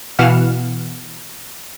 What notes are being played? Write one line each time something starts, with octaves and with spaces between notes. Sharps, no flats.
B2 E3 F5 F#5 F6 E7